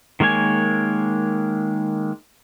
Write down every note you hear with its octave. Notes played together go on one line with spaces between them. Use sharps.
D#3 G#3 A#3 C#5 G#5